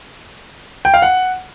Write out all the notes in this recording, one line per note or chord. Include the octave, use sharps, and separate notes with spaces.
G5
F5
F#5